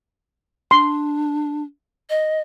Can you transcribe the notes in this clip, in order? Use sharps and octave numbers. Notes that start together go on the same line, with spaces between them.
D4 C6
D#5